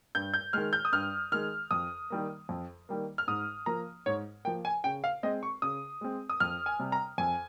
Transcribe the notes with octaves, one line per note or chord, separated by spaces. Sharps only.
G2 G6
G6
D#3 G#3 F6
G6
D#6
G2 F6
D#3 G#3 F6
F2 D#6
D#3 G3 A#3
F2
D#3 G3 A#3
F6
G#2 D#6
F3 A#3 A#5
G#2 C#5
F3 A#3 G5
G#5
C#3 G5
F5
G#3 C4 D#5
C#6
C#3 D#6
G#3 C4
D#6
F2 F6
G#5
C3 G3
A#5
F2 G#5